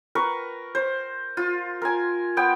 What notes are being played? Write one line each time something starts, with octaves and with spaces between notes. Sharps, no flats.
A#4 B4 C#6
C5
F4
A#4 G#5
B3 G5